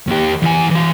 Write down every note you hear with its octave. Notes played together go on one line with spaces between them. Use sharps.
D#2 G4
E2 G#5
E3 F5